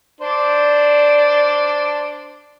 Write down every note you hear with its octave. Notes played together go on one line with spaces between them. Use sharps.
D4 C5 D5